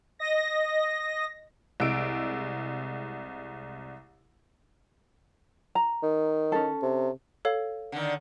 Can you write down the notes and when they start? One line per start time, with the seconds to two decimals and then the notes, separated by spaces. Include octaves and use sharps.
0.19 D#5 A#6
1.80 C2 G#3 E6 D7
5.75 A#5
6.03 D#3
6.52 C#4 A4
6.82 C3
7.45 A4 C#5 F5
7.92 D3 D#3